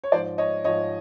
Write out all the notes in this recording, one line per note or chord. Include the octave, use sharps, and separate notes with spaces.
C#5
G#2 F3 C5 D5
C#5 D#5
G#2 F3 C#5 D#5